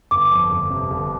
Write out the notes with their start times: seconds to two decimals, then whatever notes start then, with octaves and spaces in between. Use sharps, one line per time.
0.11 G1 D6
0.32 F2
0.51 G1
0.70 C3
0.90 G1